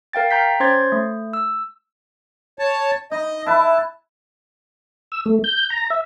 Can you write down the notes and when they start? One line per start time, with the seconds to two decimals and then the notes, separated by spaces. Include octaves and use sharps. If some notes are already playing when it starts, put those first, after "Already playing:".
0.13 A#4 F5 G5 A6
0.31 G5 A#5 G6 B6
0.60 C#4 C5 C6 G#6 A6
0.92 A3
1.33 E6
2.59 C#5 A5
3.11 D#4 D#5
3.46 E4 B4 E5 A5
5.12 E6
5.26 A3
5.44 G6
5.70 A#5
5.90 E5